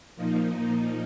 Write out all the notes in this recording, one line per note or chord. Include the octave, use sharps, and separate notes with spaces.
A#2 F3 A#3 D#4